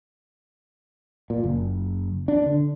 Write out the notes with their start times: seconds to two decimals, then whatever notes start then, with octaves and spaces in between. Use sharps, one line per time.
1.30 A#2
1.43 F#1
2.28 D4
2.46 D3